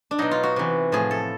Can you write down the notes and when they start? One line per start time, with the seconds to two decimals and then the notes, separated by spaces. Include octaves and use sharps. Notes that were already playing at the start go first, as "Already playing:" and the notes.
0.11 D4
0.18 B2 F#3 D#4
0.31 F4
0.43 F#4
0.56 C3 E3
0.92 A2 F3 G#4
1.11 A4